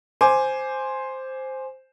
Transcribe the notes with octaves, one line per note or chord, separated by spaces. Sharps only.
C5 G#5 D6